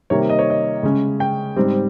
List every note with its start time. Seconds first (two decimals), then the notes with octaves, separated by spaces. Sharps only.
0.10 C3 D#3 G3 A#3 C#5
0.29 D#5
0.39 C#5
0.50 D#5
0.83 C#3 G#3 C#4
1.20 G5
1.56 G#2 G3 C4